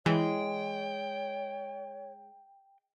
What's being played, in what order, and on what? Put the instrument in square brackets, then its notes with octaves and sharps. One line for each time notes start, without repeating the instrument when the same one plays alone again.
[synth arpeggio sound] E3 [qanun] G#3 [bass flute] C#5 [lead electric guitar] G5